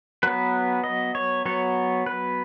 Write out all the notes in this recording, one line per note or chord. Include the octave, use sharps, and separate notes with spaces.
F#3 B3 B4
D#5
C#5
F#3 B3 C#5
B4